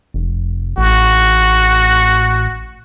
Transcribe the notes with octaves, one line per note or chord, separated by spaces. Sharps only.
F1
A1 F#4